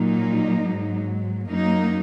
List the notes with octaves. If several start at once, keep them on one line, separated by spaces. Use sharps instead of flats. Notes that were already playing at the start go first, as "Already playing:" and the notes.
Already playing: A#2 F#3 A#3 D#4
G#2 F#3
F#2 F#3 A#3 D#4